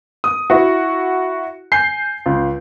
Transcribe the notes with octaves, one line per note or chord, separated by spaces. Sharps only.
D#6
E4 F#4
G#5 G6 C7
C#2